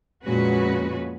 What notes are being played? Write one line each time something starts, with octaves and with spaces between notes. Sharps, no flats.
F2 A#2 G#3 C#4 F#4 B4